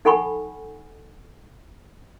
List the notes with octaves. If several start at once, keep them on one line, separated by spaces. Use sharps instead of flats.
D#4 A4 F#5 G#5 B5 C#6